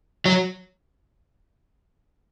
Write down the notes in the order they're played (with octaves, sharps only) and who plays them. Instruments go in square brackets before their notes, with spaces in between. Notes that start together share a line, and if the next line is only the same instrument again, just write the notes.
[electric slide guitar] F#3